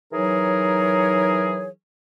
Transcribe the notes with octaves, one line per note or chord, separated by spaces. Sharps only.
E3 F#3 D#4 G#4 A#4 C#5